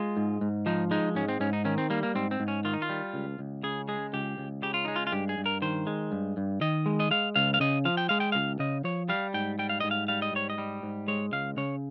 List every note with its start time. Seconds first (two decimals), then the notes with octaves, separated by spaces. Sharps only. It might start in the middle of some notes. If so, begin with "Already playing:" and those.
Already playing: G#3 F4
0.17 G#2
0.41 G#2
0.66 F3 D#4
0.91 G#3 D#4
1.15 G#2 C#4
1.29 C4
1.40 G#2 C#4
1.53 D#4
1.65 D#3 C#4
1.78 C4
1.90 G3 A#3
2.03 A#3
2.15 G#2 C4
2.31 C4
2.40 G#2
2.48 C#4
2.65 D#3 F4
2.73 D#4
2.82 F4
2.89 G3
3.14 C#2
3.39 C#2
3.63 C#3 G#4
3.88 G#3 G#4
4.13 C#2 G4
4.38 C#2
4.62 C#3 G4
4.74 F4
4.85 G#3 D#4
4.96 F4
5.07 F4
5.12 G2 G4
5.29 G#4
5.38 G2
5.46 A#4
5.62 D#3 C5
5.87 G#3
6.12 G2
6.37 G2
6.61 D#3 D#5
6.86 G#3
7.00 D#5
7.11 G#3 F5
7.36 C#2 F5
7.54 F5
7.60 C#3 D#5
7.85 F3 F5
7.97 G5
8.09 G#3 F5
8.20 G5
8.32 C#2 F5
8.59 C#3 D#5
8.84 F3 C#5
9.09 G3 F5
9.34 G#2 G5
9.59 G3 G5
9.69 F5
9.80 G#2 D#5
9.91 F5
10.08 G3 F5
10.22 D#5
10.33 G#2 C#5
10.50 D#5
10.58 G3
10.83 G#2
11.08 G#3 C#5
11.32 C#2 F5
11.57 C#3 C#5